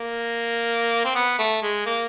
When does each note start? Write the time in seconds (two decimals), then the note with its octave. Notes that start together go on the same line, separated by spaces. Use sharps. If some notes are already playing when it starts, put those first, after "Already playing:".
Already playing: A#3
1.05 C4
1.15 B3
1.39 A3
1.62 G#3
1.86 A#3